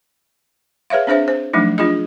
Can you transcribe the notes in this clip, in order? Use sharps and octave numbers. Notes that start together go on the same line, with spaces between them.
G#4 B4 C#5 E5 F5
C4 D4 G#4 C5 E5
C5
F3 F#3 A3 D4 D#4
D4 F4 G#4 D#5